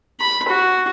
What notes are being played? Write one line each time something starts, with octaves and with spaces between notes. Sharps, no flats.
B5
F#4